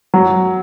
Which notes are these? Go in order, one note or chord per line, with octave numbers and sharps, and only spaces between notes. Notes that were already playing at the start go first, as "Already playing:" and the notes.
F#3